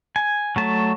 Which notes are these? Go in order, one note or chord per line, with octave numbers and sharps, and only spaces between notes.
G#5
F#3 A3 A5